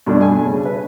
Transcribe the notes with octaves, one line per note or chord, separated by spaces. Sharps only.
G2 B2 A3 D4
G#5
C#3
B4